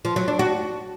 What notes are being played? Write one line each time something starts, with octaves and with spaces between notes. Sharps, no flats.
F3
F#3
D4
F#4